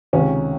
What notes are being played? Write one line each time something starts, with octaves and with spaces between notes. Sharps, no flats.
C#2 C3 D#3 C#4